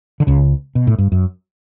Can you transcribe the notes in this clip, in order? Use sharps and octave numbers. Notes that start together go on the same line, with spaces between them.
D3
C#2 C#3
B2
A2
G2
F#2